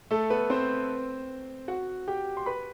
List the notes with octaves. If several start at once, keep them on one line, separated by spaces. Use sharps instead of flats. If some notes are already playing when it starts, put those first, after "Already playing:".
A3 A4
B3 B4
C4 C5
F#4 F#5
G4 G5
C6
B4 B5